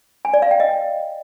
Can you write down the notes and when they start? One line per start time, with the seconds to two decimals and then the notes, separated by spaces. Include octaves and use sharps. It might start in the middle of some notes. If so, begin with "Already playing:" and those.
0.25 G#5
0.34 D5
0.42 F5
0.51 G5
0.60 D#5